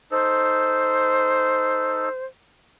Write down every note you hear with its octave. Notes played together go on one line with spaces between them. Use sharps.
D#4 A4 C5